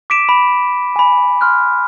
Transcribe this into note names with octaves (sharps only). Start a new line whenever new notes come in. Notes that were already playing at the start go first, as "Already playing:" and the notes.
D6 B6 D7 E7
B5
G#5 B5
C6 F6 F#6